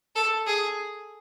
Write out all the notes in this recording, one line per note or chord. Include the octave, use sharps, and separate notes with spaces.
A4
G#4